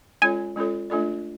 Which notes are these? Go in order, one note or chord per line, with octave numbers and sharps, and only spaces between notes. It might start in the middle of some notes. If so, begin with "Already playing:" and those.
G#3 C#4 F4 A4 C#5 G#5
G#3 C#4 F4 A4 C#5
A3 D4 F4 A4 D5